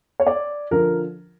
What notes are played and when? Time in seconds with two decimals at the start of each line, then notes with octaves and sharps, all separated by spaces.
0.20 C#5
0.27 D5
0.71 D3 F3 A#4